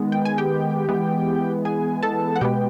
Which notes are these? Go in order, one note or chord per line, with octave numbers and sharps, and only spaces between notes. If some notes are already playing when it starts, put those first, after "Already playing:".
Already playing: D#3 G#3 B3
G5
G#5
G4 G5
E3 G#3 B3
G#4 G#5
A4 A5
F#5
B2 G#3 B3 G4 G5